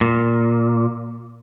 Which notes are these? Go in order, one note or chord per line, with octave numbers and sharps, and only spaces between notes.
A#2